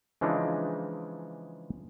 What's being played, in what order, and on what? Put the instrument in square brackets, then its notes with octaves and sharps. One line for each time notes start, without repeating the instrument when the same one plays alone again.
[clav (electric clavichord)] C#3 E3 F3 G#3 D4 D#4